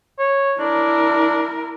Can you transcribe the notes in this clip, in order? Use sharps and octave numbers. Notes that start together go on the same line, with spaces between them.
C#5
D4 E4 A#4